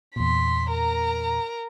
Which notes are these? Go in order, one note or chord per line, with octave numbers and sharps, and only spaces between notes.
E2 A#2 C6 B6
A#4 A#5